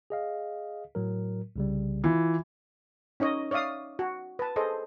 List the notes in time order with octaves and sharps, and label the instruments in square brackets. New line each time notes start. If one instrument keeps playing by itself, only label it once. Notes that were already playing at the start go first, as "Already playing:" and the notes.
[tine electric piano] G#4 D#5 F5
A2 F#3 A#4
C2 C#3 G3
[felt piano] E3 [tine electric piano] F4
[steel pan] C#4 D#4 C#5 D#5
C#5 D5 E5 F5 D#6
F#4
B4 A5
G#4 A4 C5 D#5